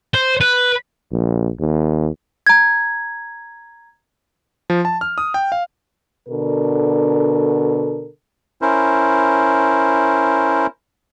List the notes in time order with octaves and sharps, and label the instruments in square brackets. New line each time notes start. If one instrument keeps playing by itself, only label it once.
[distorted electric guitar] C5
B4
[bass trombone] A#1
D#2
[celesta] A#5 G#6
[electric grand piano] F3
A5
F6
D#6
G5
F5
[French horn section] B2 D3 D4 A4 A#4
[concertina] C#4 E4 A#4 C5